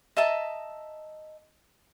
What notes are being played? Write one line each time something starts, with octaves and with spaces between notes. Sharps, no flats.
D#5 E5 A5 A#5